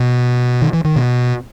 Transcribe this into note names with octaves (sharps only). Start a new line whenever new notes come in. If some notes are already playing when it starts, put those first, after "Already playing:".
Already playing: B2
D#3
E3
D#3
B2